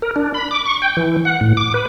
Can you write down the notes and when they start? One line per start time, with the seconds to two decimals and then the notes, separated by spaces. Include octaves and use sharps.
0.02 A#4
0.16 D4
0.34 B5
0.51 D6
0.65 C#6
0.82 G5
0.97 E3
1.25 F#5
1.41 A2
1.57 D6
1.74 B4